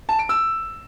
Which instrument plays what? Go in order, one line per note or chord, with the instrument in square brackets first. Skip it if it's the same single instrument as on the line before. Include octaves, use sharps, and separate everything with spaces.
[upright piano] A5
D7
E6